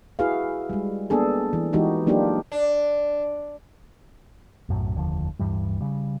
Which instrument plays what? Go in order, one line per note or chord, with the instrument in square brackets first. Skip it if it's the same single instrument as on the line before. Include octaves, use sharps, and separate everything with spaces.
[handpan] E4 F#4 G#4 B4 F5
G3 G#3
A#3 B3 D4 G#4 A4
E3
E3 G#3 D#4 F#4 G4
F#3 A#3 D4 D#4 F4 G4
[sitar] D4
[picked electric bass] B1 F#2 A2
F1 D#2 D3 F3
D1 G2 E3 G3
C#3 G3